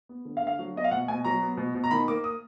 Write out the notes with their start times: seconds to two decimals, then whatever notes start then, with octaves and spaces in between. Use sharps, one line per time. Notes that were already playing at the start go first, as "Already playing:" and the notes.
0.09 B3
0.25 D3
0.37 F5
0.42 D3
0.47 F5
0.59 F#3
0.76 B3 D#5
0.84 F5
0.91 B2 F#5
1.08 B2 G#5
1.25 F#3 A#5
1.42 B3
1.57 B2
1.75 B2
1.84 A#5
1.91 D#3 B5
2.08 A#3 D6
2.24 D#6